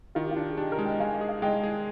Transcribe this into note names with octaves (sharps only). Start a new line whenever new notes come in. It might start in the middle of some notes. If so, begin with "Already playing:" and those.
D#3 F4
G4
F4
D4
G#4
D4 D#4 G4
G4 A#4
G#3
D#5 G5
G#3 F5 G#5
D#5
G#4
F5
G#3 D#5 G5
G#4